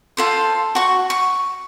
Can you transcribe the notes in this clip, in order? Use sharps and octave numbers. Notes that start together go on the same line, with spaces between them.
F4 A4 C5
F#4 C#6
C#6